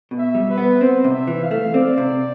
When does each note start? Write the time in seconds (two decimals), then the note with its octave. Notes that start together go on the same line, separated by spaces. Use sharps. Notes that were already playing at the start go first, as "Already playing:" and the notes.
0.11 B2
0.18 E5
0.35 G3
0.50 B4
0.58 B3
0.81 C4 C5
1.04 C3
1.12 E5
1.27 E3
1.43 F5
1.51 A3
1.74 C4 D5
1.98 C3